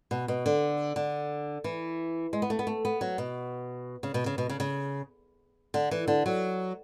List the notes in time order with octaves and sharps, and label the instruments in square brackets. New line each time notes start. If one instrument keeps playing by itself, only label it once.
[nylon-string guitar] B2
B2
D3
D3
E3
G#3
B3
A3
B3
A3
B3
F#3
B2
C#3
B2
C#3
B2
C#3
C#3
D3
E3
D3
F#3